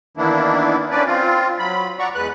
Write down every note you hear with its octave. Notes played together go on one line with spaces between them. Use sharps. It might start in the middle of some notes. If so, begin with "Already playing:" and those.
D#3 E3 A#3 B3 D4 E4
A#3 C#4 D4 B4 D5
C4 F4
F#3 B5
D5 F#5 A#5 C#6
E2 G#3 B4 F#6